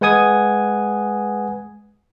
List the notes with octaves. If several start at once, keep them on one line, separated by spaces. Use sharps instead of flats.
G#3 B4 F#5 G#5 D#6 G#6